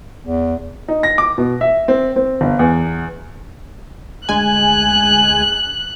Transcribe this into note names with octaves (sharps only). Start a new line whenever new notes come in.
E2
D#4
A#6
D6
B2
E5
C4
C4
G1
E2
D2 G#3 G#5 F#6